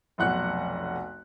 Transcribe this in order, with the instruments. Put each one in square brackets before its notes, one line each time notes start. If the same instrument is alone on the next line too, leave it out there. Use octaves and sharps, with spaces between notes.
[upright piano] F1 B1 F#5 F#6